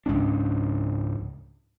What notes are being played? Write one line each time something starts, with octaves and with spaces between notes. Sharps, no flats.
C#2 G#2 C#4 D4